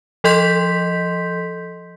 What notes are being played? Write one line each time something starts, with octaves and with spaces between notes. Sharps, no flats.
F3 A4 D#5 C6 G6 B6